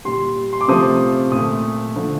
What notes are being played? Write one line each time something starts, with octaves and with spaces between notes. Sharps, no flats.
A#2 G3 C6
C6
D6
C3 F3 A3 D#6
A#2 A3 D#6
D3 F3 A3